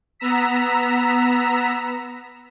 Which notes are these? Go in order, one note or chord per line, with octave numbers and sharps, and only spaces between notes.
B3 A#5 E6 B6